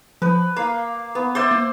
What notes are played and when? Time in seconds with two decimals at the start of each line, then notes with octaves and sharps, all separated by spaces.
0.22 F3 B4
0.56 A#3 F5
1.15 B3
1.35 C5 D5 E5 C6
1.51 A#3